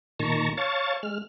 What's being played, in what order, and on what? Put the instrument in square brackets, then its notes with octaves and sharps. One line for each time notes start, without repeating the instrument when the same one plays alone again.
[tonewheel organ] A#2 D#3 A5 A#5 C#6
C#5 F5 A5 C#6 A6
G#3 F6